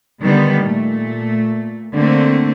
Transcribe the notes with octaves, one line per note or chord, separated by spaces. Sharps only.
D3 D#3 G3 B3
A#2 A3
D3 A3 A#3 C4